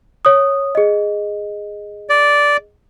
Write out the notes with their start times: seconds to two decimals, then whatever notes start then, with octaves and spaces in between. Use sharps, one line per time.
0.25 C#5 D#6
0.75 G#4 D#5
2.10 D5